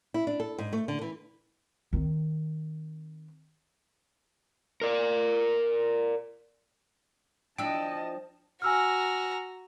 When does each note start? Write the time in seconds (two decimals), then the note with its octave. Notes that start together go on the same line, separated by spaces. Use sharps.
0.14 E4
0.27 D4
0.40 A4
0.58 G#2
0.73 A3
0.88 D3
1.01 E3
1.93 D#3 C4
4.81 A#4 D5
7.58 F3 D4 E4 D#5 G5 A5 E6
8.62 F#4 G#5 A#5 E6 F6